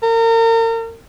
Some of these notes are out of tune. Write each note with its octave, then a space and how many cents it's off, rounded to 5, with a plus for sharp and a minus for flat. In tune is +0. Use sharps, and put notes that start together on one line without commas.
A#4 -35